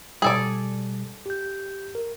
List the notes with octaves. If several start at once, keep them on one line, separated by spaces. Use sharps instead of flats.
B2 G3 G#4 A4 D5
G4 G6
A#4